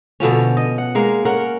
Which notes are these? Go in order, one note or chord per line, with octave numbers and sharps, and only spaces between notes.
B2 D3 F3 C#4
D#5
F#5
G#3 A#3 A#4
C#4 A#4 F#5